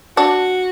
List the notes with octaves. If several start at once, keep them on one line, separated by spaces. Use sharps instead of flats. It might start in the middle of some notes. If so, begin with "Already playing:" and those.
D4 F#4